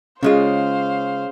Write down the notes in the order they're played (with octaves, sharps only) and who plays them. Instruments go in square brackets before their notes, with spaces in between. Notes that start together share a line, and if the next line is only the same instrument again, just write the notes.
[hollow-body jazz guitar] C#3 G#3 F4 [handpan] C#4 G#4 [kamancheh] C5 F5